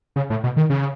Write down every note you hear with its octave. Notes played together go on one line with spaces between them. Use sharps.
C#3
A2
B2
D#3
C#3